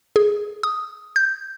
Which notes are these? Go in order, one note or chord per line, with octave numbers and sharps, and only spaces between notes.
G#4
D#6
G6